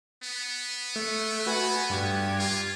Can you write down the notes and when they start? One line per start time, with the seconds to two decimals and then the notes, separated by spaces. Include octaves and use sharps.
0.23 B3
0.96 A3
1.47 F#4 B4 G#5
1.90 G2 G4 G#6
2.39 F4